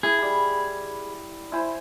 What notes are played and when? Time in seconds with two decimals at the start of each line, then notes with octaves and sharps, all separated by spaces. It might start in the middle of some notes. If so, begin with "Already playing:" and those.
0.03 E4 G#4
0.19 G3 B5
1.52 E4 C5 G#5